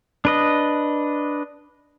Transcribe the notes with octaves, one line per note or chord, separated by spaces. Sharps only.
D4 B4 D#5